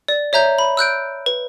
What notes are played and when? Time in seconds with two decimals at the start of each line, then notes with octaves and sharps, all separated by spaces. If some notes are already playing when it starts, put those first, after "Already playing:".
0.08 D5
0.33 C#5 E5 A#5 G6
0.58 B5
0.77 E6 F#6 G6 D7
1.26 B4